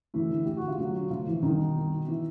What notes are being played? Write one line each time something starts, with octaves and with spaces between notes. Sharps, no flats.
D2 E3 E4
D3
D2 G4
D3 F#4
F4
D2 F#3 F#4
D3
D2 F3 F4
D3 E3 E4
C2 D#3 D#4
B2
C2
B2
E3 E4